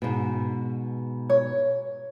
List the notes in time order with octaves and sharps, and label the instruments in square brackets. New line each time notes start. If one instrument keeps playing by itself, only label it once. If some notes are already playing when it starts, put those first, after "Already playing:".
[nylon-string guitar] G#2 B2
[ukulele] C#5